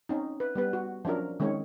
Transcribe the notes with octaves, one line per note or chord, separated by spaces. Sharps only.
C4 C#4 D#4
B4
G3 B3 B4
F#4
F3 F#3 C#4 D4 A#4
D#3 G#3 C4 C#4 C#5